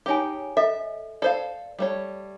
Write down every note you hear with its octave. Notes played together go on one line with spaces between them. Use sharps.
D#4 G4 G#4 C#5 G#5
A4 D#5 E5
A4 C5 D5 F5
G3 A3 C#5